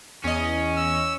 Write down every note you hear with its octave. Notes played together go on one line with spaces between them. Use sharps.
E2 C#4 D#5
E6